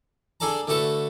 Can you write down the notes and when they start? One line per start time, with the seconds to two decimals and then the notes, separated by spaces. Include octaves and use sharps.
0.40 D4 G#4 A4 D5 A5 A#5
0.68 D3 A3 F#4 A4 B4